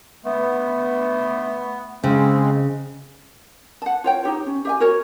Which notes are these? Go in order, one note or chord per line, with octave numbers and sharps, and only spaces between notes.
A3 B3
C#3 G#3 C4
F#5 A5
F4 C#5 G5
D#4 G4 C#5
C#4
G4 E5 G#5
F#4 A#4 C#5